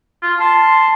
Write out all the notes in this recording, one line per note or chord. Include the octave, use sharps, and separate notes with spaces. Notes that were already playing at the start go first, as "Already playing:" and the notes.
F4
A5 C6